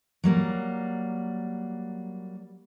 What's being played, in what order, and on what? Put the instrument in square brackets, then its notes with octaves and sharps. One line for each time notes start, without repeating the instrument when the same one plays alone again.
[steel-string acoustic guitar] F#3 G3 A#3